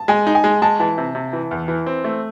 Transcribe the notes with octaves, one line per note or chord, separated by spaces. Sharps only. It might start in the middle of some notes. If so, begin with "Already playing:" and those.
Already playing: A5
G#3 G#5
D#4
G#5
G#3
G#3 A5
E3 A5
C3
C3
E3
E2
E3
C4
A3